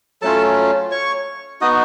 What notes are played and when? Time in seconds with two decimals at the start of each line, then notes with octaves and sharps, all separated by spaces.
0.22 F#3 A3 C#4 F4 A4 A5
0.91 C#5 C#6
1.61 B3 D#4 F#4 D#5 D#6